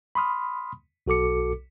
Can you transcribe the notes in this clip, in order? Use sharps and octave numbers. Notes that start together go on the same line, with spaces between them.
B5 C6 D#6 F6
B1 F#4 A4 D6 C#7